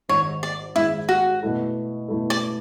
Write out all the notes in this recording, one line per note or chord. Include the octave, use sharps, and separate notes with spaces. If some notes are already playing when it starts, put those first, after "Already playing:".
G#1 G#2 G#3 C#5
D5
G#1 G#2 G#3 E4
F#4
B2 A3 E4 A4
B2 A3 E4 A4
D5